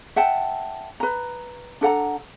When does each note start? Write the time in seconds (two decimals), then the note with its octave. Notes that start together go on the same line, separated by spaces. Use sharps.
0.16 E5 F#5 G5 A5
1.00 B4 A#5
1.81 D4 A4 F#5 A#5